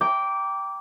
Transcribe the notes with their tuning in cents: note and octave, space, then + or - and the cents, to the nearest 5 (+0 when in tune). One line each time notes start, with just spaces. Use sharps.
G5 +0 A#5 +0 D6 -15